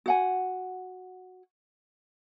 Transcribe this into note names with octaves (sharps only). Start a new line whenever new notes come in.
F#4 F#5 G#5